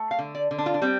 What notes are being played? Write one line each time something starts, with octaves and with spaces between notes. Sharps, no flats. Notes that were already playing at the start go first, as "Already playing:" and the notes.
Already playing: A3
F5
D3
D5
D3
D4
F4
D4
G3 C4